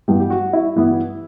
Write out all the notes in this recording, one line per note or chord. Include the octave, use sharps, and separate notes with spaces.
G2 E3 G3 B3 G4
G4
F#4
E4
G2 E3 G3 B3